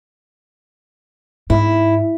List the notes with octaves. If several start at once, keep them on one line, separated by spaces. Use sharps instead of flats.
G#2 E4